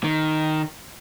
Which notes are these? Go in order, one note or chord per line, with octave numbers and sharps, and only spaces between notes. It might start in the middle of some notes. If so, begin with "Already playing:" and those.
D#3